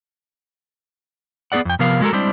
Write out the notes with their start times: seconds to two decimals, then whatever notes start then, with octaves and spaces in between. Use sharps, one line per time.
1.52 B3 C4 G#4 D5 F#5
1.65 F2 G5
1.79 C3 F3 B3 A#4 F5
2.01 G#3 F#4 A4 A#4
2.13 G3 G#3 C4 D4 E4 C5